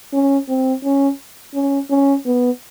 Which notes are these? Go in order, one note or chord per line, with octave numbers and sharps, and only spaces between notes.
C#4
C4
C#4
C#4
C#4
B3